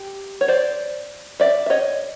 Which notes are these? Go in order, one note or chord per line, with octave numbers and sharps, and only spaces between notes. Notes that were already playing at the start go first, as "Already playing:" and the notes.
Already playing: G4
C#5
C5 D5
D5 E5
E5
C#5 D#5